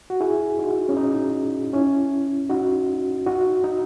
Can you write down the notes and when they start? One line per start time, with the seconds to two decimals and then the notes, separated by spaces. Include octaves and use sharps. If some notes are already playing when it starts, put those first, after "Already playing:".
0.10 F#4
0.20 E4 G#4
0.59 D#4 F#4
0.89 C#4
0.97 D#4
1.73 C#4 E4
2.50 D#4 F#4
3.26 D#4 F#4
3.64 D#4